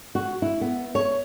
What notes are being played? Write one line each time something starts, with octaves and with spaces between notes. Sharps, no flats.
F#4
E4
B3
C#5